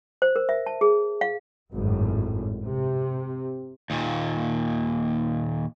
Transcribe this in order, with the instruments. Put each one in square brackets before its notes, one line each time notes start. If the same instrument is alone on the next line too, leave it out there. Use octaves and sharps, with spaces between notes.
[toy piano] C5
A#4
E5
A5
G#4
F5
[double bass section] G#1 F#2 A2
C3
[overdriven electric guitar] D#2 A#2